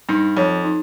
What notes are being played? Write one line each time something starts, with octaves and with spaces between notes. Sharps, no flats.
G2 D#4
F2 C#5
D#4